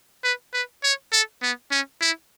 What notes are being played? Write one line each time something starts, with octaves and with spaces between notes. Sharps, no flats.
B4
B4
C#5
A4
B3
C#4
E4